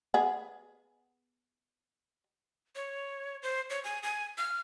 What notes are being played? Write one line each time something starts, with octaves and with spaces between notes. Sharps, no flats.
B3 G#4
C#5
C5
C#5
G#5
G#5
F6